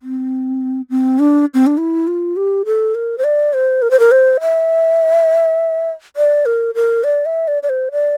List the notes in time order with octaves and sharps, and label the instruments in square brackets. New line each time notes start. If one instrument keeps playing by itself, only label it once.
[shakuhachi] C4
C4
D4
C4
D4
E4
F4
G4
A4
A#4
C5
D5
C5
A#4
C5
A#4
C5
E5
D5
A#4
A#4
D5
E5
D5
D5
C5
D5